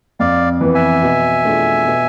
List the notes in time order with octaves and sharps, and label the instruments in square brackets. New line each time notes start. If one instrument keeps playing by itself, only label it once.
[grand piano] F2 [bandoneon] D5 F5
[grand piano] E3 B3
[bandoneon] E5 G#5
[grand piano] B2
A3 D4 F4 G#4
B2